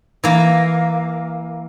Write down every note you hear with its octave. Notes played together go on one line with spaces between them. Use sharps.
E3 A#3